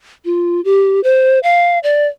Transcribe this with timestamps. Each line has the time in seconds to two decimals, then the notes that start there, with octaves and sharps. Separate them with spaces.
0.25 F4
0.65 G4
1.04 C5
1.43 F5
1.83 D5